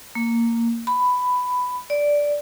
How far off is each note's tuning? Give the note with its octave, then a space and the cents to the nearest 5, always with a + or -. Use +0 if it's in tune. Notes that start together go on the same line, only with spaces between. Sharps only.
A#3 -10
B5 +10
D5 -5